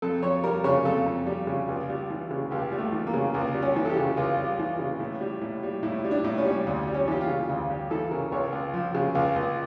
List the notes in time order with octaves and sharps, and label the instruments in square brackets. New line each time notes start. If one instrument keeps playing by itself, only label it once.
[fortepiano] F2 A4
F2 C#5
G3 A#4
C#3 C#5
F2 A4
F2
G3
C#3
C#2
G3
E3
C#3
C#2 G4
G3
A3
E3
A#3
C#3
C#2 A#3
G3
C#4
E3
A4
G4
C#3
C#2 F4
G3
E3
C#3
A2
G3
A2
G3
A2 E4
G3
D4
A2
C#4
G3
D2
G3
C#4
E3 G4
F4
C#3
D2
G3 G4
E3 A4
C#3 A#4
C#2 C#5
C#2
F3
C#3
C#2
C#2